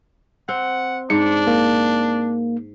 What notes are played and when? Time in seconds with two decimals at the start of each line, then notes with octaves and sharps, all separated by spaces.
0.49 C4 F#5
1.10 G#2 D4 C#7
1.47 A#3